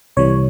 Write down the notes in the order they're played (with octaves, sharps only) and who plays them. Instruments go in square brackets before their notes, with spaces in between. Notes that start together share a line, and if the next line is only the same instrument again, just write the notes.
[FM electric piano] C2 C3 E3 G3 C#5